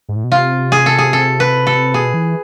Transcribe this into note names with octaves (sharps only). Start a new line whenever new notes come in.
G#2
A2
B2
C3 F4
G#4
A4
G#4
A4
B4
A4
B2 G#4
E3